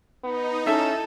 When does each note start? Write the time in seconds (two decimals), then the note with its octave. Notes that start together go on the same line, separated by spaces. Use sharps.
0.24 B3 D#4
0.67 C#4 E4 A4 E5